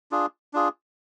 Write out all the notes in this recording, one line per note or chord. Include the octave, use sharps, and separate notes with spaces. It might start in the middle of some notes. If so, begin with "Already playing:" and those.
D4 F4 G#4
D4 F4 G#4